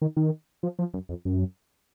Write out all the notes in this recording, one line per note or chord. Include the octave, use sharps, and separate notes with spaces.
D#3
D#3
F3
F3
F#2
F2
F#2